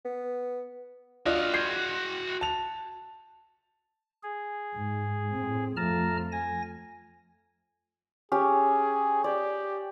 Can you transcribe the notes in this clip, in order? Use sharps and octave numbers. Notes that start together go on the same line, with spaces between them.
B3
D4 F4 F#4 D#5 F5
G6 G#6 C7
A5 F7
G#4
G#2
A2 C4
F2 F3 A3 A5 A#5 F6
G#5 A#6
C#4 G4 G#4
G4 D5